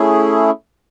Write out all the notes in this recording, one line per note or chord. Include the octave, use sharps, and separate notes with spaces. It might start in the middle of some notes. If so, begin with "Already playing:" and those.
Already playing: A3 C#4 E4 G#4